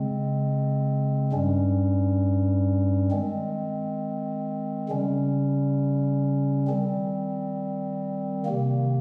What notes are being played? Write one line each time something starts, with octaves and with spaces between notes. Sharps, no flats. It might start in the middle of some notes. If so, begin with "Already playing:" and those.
Already playing: C#3 G#3 C4
G2 G3 C#4
D#3 G#3 C4
C#3 G3 C#4
D#3 G3 C4
C3 D#3 A#3